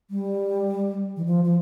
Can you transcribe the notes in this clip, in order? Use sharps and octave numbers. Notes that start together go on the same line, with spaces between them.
G3
E3
F3
F3